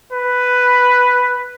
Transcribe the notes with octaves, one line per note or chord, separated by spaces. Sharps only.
B4